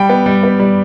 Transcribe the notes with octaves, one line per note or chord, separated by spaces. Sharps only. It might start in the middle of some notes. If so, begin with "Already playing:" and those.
Already playing: G3 G5 B5
B3
G3
B3
G3